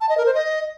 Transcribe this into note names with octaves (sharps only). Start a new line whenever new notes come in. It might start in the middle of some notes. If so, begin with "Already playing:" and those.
A5
D#5
A#4
C5
D#5